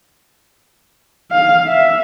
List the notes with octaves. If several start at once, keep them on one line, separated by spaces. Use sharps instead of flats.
F5
E5